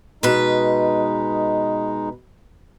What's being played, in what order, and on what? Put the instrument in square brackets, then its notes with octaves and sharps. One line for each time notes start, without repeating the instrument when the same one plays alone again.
[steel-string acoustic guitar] B2 B4 [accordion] G#3 D#4